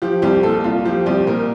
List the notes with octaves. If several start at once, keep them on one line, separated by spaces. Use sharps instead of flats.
F3 G4
C2 G4
A#2 A4
C2 F4
F3 G4
C2 G4
A#2 A#4